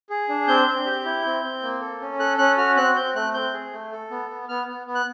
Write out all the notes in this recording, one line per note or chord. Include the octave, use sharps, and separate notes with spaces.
G#4
D4
C4 G6
C4
G4
E4
C4
C4
A#3
A4
C#4
A4 F#6
C#4 F#6
F#4 F6
C4 F#6
C4 G6
A3 F#6
C4 G6
G#4
A3
A4
B3
B3
B3 F6
B3
B3
F#6